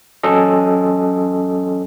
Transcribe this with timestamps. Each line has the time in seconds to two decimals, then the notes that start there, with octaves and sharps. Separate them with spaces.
0.23 F#3 C#4 A4 D#5